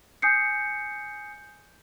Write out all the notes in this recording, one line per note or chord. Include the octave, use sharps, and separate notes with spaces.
G#5 D#6 G6 C7 C#7